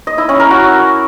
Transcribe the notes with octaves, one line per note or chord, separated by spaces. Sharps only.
D#5
E4
C#4
A#4
F#4